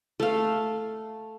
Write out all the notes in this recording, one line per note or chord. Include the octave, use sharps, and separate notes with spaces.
A3 F5